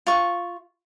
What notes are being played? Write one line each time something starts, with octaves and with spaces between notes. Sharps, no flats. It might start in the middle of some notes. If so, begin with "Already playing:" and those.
F4 C#6